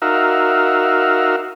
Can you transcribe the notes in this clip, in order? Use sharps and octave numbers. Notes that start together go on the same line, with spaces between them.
D#4 F#4 A#4 E5 F5